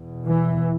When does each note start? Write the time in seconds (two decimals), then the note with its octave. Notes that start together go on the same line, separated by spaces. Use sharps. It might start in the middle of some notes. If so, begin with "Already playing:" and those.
Already playing: E2 B2
0.25 E3